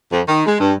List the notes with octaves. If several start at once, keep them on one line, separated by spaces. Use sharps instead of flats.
F2
D#3
G#3
G2